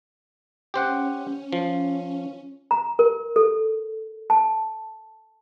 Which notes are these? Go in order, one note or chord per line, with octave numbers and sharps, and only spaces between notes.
C#4 G4 C5 F#5
F3
A#5
A#4
A4
A5